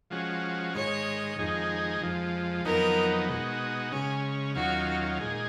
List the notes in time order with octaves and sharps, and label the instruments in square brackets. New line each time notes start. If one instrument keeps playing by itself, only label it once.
[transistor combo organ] F3 G#3 C#4 F#4
[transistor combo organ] G#2 D#3 G#3 [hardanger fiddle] C#5
[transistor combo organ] F2 D#3 G#3 D#4 G#4
F2 F3 G#3
[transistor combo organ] F2 D#3 F#3 B3 D#4 [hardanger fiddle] A#4
[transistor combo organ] B2 G#3 D#4 F#4
[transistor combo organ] C#3 G#3 C#4 [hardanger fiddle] G#4
[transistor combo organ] D#2 D#3 F#3 C#4 F4 [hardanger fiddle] F#4
[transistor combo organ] A#2 G#3 D#4 G#4